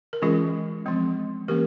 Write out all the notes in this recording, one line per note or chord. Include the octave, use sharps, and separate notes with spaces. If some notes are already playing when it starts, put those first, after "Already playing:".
A#4
E3 G#3 C#4 F4 G#4
F3 G#3 C4
E3 A#3 C#4 G4 A#4